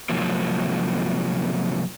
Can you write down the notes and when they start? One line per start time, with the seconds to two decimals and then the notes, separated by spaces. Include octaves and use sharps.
0.09 G#2 C3 F3 F#3 A#3